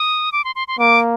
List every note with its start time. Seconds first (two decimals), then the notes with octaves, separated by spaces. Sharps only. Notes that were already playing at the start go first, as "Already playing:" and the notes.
Already playing: D#6
0.32 D6
0.44 C6
0.56 C6
0.68 C6
0.79 A#3 D6